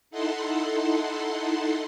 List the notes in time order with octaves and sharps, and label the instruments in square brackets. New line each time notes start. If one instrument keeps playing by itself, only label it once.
[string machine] D#4 E4 A4 F#5 C6